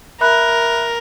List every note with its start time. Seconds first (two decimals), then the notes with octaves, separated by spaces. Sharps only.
0.21 A#4 E5 B5 F#6